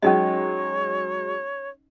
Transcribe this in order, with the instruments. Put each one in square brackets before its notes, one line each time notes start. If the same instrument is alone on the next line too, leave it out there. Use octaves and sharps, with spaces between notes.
[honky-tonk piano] F#3 G#3 [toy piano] C#4 D#4 D#5 [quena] C#5